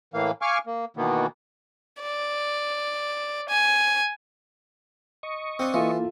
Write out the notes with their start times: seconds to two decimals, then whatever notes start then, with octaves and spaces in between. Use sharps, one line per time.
0.14 A2 E3 A#3 F5
0.42 F5 G#5 C#6 D6 F6
0.67 A#3
0.97 B2 D#3 E3 A#3 B3
2.02 D5
3.49 G#5
5.23 D#5 C#6
5.59 C4 D4 F5
5.74 E3 A#3 E4 F4 A4 E5